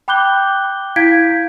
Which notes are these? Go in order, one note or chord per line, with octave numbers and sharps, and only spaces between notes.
G5 B5 D6 F#6 G6 G7
E4 F5 G6 G#6 B6 D7